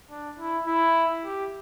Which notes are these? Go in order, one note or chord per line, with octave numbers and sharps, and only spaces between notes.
D4
E4
E4
G4